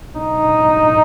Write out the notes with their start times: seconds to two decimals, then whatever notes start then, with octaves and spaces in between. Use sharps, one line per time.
0.18 D#4